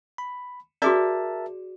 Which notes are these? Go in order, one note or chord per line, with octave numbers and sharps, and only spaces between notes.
B5
F#4 G#4 A#4 D5 E5 A5